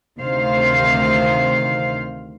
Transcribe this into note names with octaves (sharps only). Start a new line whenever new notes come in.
D2 C3 D#3 C5 F5